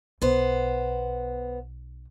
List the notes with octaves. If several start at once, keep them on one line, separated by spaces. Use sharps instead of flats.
B1 B3 C5